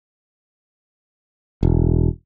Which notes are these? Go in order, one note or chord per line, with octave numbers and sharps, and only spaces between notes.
E1